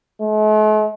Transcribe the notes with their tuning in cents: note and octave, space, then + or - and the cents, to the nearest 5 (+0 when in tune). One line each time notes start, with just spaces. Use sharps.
A3 -45